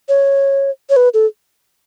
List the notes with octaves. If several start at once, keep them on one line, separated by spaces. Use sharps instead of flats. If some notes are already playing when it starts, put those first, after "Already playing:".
C#5
C#5
B4
A4